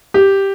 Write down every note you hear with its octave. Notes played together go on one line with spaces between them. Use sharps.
G4